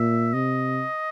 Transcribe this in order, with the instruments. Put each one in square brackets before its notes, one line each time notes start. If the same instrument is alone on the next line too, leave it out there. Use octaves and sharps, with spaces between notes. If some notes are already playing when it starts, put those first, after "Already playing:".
Already playing: [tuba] A#2 [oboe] E5
[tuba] C3 [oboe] D#5